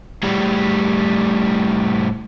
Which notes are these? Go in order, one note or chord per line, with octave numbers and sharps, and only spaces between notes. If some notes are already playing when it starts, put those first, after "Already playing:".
A2 G3